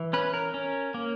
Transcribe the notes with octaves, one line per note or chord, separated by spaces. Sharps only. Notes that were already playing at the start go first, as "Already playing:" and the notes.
Already playing: E3
C#4 B4
A#4
C#4
A#3